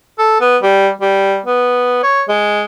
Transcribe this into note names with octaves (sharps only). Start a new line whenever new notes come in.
A4
B3
G3
G3
B3
C#5
G#3